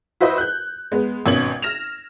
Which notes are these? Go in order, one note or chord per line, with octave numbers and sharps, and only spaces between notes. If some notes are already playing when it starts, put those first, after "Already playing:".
E4 F#4 B4 C5 D#5
F#6 G6
G#3 B3
G#1 B2 C#4 G#6 F#7
F6 A#6 E7 F7